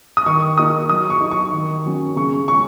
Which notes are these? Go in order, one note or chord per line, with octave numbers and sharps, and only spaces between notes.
D#6
D#3 C#6
A#3 D#4 D#6
F#3 D#6
C#6
D#4
C#6
D#3
F#3 C#4
C#3 C#6
G#3 C#4 C#6